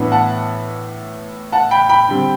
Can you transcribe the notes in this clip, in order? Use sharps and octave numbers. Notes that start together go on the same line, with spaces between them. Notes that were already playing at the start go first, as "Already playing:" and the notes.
Already playing: A2 E3 B3 D4
F#5 A5
F#5 A5
G5 B5
G5 B5
D3 G3 C4